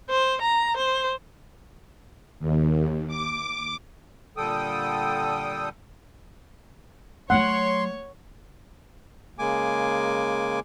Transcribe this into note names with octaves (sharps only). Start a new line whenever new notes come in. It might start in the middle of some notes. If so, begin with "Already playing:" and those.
C5
A#5
C5
D#2
D6
A#2 D3 G3 A4 G5 D#6
F#3 A3 C#5 F#5 C6
C#3 G#3 A#3 G#5 D6